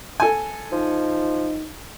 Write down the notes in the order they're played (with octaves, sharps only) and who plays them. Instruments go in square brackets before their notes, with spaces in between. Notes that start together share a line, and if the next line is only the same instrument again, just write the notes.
[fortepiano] A4 G#5
[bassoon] F3 [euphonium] D#4